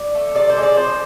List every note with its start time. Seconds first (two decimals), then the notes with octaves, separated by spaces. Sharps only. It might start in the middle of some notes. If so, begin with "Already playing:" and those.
Already playing: D5
0.15 A3
0.35 C3 D5
0.50 C5
0.57 G#3
0.63 D5
0.77 F3 C5